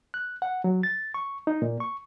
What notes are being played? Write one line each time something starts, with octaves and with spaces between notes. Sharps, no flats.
F#6
F#5
F#3
A6
C#6
D#4
A#2
C#6